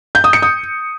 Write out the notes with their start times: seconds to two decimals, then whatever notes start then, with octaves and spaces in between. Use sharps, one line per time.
0.15 G6
0.24 D#6
0.33 C#7
0.42 D#6